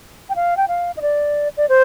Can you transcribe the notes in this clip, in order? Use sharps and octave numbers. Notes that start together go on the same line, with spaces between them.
G5
F5
G5
F5
D#5
D5
D5
C5